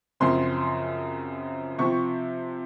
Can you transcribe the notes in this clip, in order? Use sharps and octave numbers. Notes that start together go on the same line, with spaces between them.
F#2 C#3 F3 C4 C6
C3 F3 C4 C#6